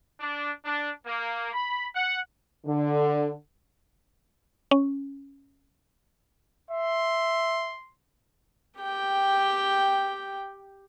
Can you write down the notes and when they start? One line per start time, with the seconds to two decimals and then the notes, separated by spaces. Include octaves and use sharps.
0.20 D4
0.64 D4
1.05 A#3
1.53 B5
1.94 F#5
2.66 D3
4.71 C#4
6.70 E5 C6
8.81 G4 G5